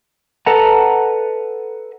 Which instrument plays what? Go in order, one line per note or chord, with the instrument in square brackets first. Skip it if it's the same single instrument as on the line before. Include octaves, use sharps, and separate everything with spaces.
[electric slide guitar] A4 B4 D#5 F#5 A5 A#5